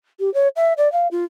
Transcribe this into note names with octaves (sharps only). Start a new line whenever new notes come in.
G4
C#5
E5
D5
F5
F4